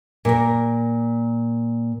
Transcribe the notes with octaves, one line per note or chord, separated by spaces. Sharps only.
A#2 A#4